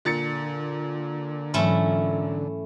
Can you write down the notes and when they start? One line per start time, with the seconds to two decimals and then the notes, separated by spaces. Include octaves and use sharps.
0.05 A#2 D3 A6 C#7
1.54 G#2 E3 F#3 A3 C#4 E4